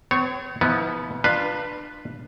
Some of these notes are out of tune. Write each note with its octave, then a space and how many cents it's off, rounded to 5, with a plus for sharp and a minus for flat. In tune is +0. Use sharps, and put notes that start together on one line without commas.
C4 -45 C#5 -5
F3 -25 B3 +0 E4 -45
D4 +30 F4 +0 B4 -5